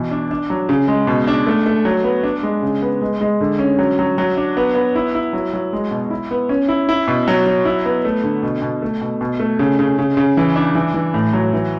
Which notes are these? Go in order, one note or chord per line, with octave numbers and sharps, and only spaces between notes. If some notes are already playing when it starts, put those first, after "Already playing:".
Already playing: B2 E3
D4
D4
F#3
C#3
G#3
B2
D4
A3
A3
F#3
B3
D4
G#3
C#3
B3
G#3
G#3
D3
C#4
F#3
F#3
F#3
D4
B3
B3
E4
E4
F#3
F#3
G#3
B2
E4
B3
C#4
E4
E4
B2
F#3
F#3
E4
B3
A3
D3
B2
B2
A3
B2
B2
A3
C#3
C#3
C#3
C#3
E3
D4
E3
E3
A2
F#3
E3